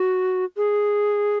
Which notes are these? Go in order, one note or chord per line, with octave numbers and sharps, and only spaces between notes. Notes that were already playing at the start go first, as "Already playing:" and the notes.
Already playing: F#4
G#4